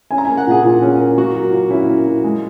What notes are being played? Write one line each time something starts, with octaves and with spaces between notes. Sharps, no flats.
C#4 G#5
A#5
A#3 G#5
F#5
A#2 G#4
A#2
C#4
A#3
A#3 F#4
F#3
A#2
C#4 E4
A#3
F#3
G#3